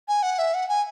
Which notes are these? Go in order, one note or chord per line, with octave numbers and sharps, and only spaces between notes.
G#5
F#5
E5
F#5
G#5